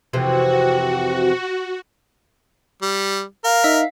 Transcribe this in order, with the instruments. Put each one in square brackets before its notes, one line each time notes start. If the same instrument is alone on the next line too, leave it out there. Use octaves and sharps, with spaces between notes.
[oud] F2 C3 E3 [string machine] F#4
[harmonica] G3
[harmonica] A#4 [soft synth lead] F5
[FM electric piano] D#4 E5 B6